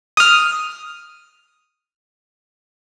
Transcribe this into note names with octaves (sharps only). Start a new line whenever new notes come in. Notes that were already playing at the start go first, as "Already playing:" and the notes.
D#6 F6